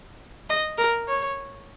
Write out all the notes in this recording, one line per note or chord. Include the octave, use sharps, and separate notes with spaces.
D#5
A#4
C#5